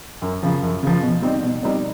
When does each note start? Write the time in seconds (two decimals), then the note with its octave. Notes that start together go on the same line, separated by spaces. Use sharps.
0.22 F#2
0.43 C#3 F3
0.63 F#2
0.83 C#3 F3
1.02 B2
1.22 G3 C4 D#4
1.43 B2
1.63 G3 C4 D#4